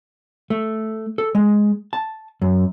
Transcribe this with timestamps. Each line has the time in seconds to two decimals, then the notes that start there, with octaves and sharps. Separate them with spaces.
0.50 A3
1.18 A4
1.35 G#3
1.93 A5
2.42 F#2